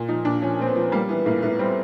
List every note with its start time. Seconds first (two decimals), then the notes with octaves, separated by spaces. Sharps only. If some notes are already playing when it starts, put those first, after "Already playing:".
Already playing: A#2
0.09 F3 D#4
0.25 A#2 D4
0.42 F3 C#4
0.59 A#2 C4
0.67 B3
0.76 F3
0.92 G3 A#3
1.09 E3 B3
1.26 A2 A#3
1.42 A2 B3
1.59 G3 C4